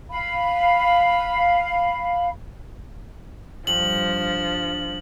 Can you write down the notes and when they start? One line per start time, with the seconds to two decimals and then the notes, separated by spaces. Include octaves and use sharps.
0.10 F5 B5
3.67 G2 F3 F#7